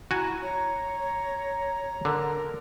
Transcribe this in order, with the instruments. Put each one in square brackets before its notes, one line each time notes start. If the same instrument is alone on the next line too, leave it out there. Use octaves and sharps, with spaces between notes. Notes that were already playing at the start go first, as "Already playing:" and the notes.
[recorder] E4 [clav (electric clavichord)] F#4 G#5 [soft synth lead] A#5
[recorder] C#5 [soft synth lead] A#5
[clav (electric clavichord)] D3 [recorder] A#4